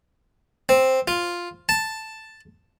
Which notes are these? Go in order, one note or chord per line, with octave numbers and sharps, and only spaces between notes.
C4
F4
A5